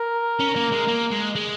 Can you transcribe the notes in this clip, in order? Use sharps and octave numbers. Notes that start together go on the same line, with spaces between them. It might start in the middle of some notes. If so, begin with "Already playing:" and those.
Already playing: A#4
C#4
A#3
G#3
A#3
G#3
G#3